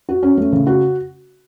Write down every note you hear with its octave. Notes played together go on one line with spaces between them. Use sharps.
F#4
C#4
A3
C#3
F#4